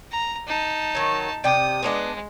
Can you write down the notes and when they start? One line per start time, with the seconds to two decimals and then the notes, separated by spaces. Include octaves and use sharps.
0.11 A#5
0.47 D#4 A5
0.95 D#3 F#3
1.44 C3 D5 G5 D#6
1.83 G#3 B3 D4 D5